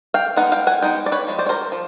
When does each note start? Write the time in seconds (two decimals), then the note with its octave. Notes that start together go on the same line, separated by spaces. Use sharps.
0.14 F5 G5
0.36 G#3 B3 D#4 F#5
0.52 F5 G5
0.67 F#5 G#5
0.82 G#3 B3 D#4 G5
1.06 D5
1.12 B4 C#5
1.27 F3 G#3
1.39 C5 D5
1.46 C#5
1.49 A#4 C5
1.72 F3